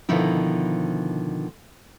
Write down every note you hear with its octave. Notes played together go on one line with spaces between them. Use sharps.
B2 D3 D#3 F3 E4